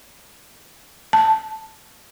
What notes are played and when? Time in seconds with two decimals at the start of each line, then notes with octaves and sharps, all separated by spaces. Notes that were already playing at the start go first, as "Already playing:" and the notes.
1.13 A5